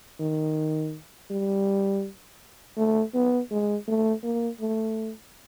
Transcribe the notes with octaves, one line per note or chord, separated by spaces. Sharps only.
D#3
G3
A3
B3
G#3
A3
A#3
A3